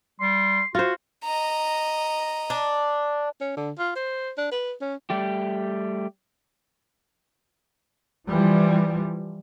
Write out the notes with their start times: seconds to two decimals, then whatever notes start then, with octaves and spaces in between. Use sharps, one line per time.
0.21 G3 C6
0.75 F4 F#4 C5
1.24 D#5 A#5
2.50 D4
3.41 C#4
3.57 D3
3.78 F4
3.96 C5
4.37 D4
4.51 B4
4.81 C#4
5.10 G3 A3 G4
8.27 E3 F3 G3